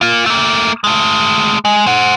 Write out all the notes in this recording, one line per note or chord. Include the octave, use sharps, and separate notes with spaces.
A#3 F4
A3 A#3
G#3 A3
G#3
C5 F#5